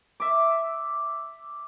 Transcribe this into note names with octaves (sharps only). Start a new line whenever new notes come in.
E5 D6